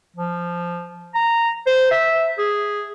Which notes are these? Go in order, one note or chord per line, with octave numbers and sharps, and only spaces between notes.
F3
A#5
C5
E5
G#4